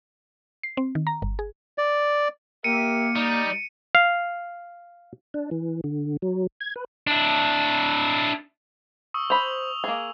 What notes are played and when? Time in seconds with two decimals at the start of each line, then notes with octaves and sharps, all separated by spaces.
0.63 C7
0.77 C4
0.95 D#3
1.07 A#5
1.22 G1
1.39 G#4
1.78 D5
2.64 A#3 G4 A#4 E5 C#7 D#7
3.16 G3 D#4
3.95 F5
5.34 D4
5.51 E3
5.84 D3
6.22 F#3
6.61 G#6
6.76 B4
7.07 D4 E4
9.14 C#6 D#6 E6
9.30 C5 B5 F7
9.84 A#3 G#4